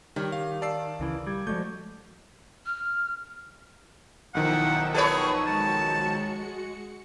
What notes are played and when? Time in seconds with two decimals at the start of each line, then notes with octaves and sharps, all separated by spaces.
0.16 D#3 G3 C#5
0.32 G4 F5
0.62 D5 F5 A5 E6 C7
1.00 C#2 C#3 E3
1.27 G3 D6 G#6
1.47 F3 G#3 A3 F#4 D5 G6
2.66 F6
4.35 B1 D#3 F3 E4 F#5 G5 E6
4.94 G#4 A4 B4 C#5 F#5 C#6 E6
5.47 G#3 F#4 A5 C#7